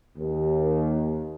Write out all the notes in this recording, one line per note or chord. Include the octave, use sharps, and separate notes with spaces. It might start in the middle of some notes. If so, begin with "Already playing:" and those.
D#2